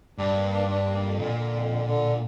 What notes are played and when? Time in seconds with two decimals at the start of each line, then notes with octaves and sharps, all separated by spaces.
0.18 G2 D4
0.35 A#3
0.52 D4
0.68 D4
0.86 A#3
1.03 F2
1.19 A#2 D3
1.36 D3
1.54 F2
1.70 D3
1.87 D3